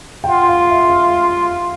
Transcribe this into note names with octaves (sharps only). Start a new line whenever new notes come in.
G5
F4 F#5
F5
E5
F5